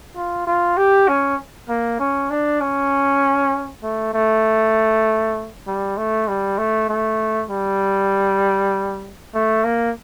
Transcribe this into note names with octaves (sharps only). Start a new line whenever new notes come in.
F4
F4
G4
C#4
A#3
C#4
D4
C#4
A3
A3
G3
A3
G3
A3
A3
G3
A3
A#3